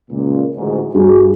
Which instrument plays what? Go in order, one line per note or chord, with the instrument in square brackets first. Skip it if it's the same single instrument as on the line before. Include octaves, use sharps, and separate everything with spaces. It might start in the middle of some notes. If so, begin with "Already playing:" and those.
[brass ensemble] C#2 A#2
A1 D2 G#2
[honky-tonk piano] G2 [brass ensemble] F#4 G#4